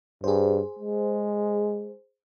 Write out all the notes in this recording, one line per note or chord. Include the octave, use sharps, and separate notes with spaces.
G2 G#4 C5
G#3